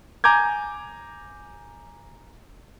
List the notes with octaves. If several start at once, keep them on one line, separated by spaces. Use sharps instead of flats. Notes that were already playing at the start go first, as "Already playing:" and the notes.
G#5 A#5 D6 G6 G#6